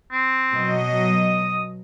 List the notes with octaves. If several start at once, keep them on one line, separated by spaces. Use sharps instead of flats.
C4
B2 F#3 D#5
D#6